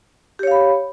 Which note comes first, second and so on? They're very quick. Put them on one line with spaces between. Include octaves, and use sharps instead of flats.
G4 C#5 F5 B5